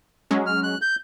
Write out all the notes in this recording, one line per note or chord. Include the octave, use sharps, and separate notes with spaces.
F#3 G#3 C#4
F6
F#6
G6